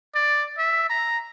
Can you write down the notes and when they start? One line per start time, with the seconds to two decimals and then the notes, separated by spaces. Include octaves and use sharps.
0.15 D5
0.58 E5
0.90 A#5